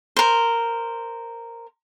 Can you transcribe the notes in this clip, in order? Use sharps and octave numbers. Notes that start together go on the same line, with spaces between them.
A#4 C5